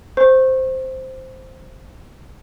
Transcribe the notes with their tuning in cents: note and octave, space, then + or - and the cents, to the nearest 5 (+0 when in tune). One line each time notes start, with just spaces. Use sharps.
C5 +0 C#6 -30